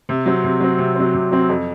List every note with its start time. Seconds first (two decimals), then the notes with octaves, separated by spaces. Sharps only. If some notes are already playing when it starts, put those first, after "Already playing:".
0.09 C3
0.26 F#3 C4
0.44 C3
0.60 F#3 C4
0.79 C3
0.96 F#3 C4
1.14 C3
1.32 F#3 C4
1.49 F2